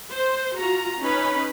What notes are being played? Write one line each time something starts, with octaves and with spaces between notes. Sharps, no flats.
C5
F4 F#4 A#5
C#4 D#4 B4 B5